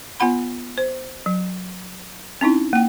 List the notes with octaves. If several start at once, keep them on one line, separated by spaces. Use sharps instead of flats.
B3 F4 F#5 B5
C5
F#3
C4 C#4 D#4 E4
A#3 G5